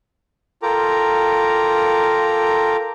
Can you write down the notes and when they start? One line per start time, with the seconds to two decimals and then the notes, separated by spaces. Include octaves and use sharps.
0.63 F4 A4 A#4 G5 A#5 D6